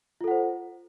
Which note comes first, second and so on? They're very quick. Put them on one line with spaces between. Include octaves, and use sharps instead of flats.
F4 A4 F#5 C5